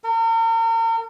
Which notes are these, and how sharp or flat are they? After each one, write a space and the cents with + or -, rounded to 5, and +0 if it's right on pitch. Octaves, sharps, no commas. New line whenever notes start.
A#4 -40